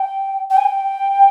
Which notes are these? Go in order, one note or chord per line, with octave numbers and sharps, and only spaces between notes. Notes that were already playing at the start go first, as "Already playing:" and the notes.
Already playing: G5
G5
G#5
G5